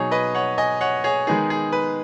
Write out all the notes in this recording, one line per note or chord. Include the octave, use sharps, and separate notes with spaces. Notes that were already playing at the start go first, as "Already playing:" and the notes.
Already playing: B2 F#3 D#4 G#4 C#5
B4 D#5
C#5 F#5
D#5 G#5
C#5 F#5
G#4 C#5
D#3 G#3 B3 D#4 G#4
G#4
B4